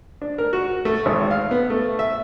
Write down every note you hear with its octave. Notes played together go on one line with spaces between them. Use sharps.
D4
A#4
F#4
A3
G#1
F5
B3
A3
E5